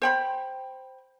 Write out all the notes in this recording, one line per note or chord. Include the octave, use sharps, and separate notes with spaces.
C5 G5 B5